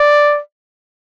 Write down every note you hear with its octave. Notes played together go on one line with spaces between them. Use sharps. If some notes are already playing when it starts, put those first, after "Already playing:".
Already playing: D5